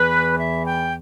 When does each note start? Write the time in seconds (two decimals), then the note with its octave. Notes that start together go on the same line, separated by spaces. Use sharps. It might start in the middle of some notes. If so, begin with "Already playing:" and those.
Already playing: E2 E3 B4
0.38 E5
0.64 G5